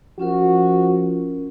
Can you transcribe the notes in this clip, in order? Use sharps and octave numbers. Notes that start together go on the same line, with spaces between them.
F3 C#4 F4 F#4 A#4